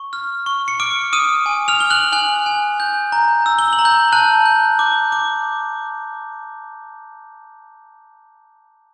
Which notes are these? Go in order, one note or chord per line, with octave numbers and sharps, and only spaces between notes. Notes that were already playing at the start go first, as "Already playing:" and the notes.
Already playing: C#6
F6
C#6
C#7
D6 F6 D7
D#6 F6 D#7
G#5
F6 F7
F6 G7
F#6 F#7
G#5 F#6 F#7
G#5
G6
A#5
E6
G7
F#7
A#5
G6 G7
A5 F#6 F#7
G6
D6
D6